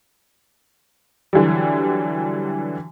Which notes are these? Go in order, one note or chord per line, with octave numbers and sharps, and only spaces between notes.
D3 E3 F#3 G3